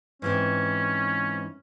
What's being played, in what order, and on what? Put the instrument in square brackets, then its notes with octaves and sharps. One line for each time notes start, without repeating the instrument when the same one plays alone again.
[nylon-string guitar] G#2 E3 C4 [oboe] C#4